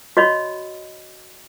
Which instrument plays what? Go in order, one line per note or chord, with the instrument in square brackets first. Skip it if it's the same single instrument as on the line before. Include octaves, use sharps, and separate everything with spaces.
[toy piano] F#4 C#5 D#5 B5